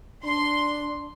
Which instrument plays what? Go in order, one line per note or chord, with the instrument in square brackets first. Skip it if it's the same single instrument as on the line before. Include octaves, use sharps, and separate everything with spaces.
[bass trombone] D4 [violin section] C6